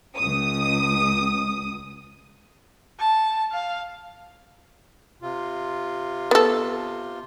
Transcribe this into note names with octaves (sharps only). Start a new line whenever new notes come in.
C#2 D#6
A5
F5
C3 F4
B3 A4